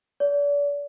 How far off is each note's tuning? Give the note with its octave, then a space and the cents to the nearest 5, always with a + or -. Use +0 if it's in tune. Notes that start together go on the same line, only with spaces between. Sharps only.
D5 -40